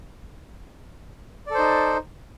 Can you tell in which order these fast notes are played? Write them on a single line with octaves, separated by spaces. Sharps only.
D5 A4 C5 D#4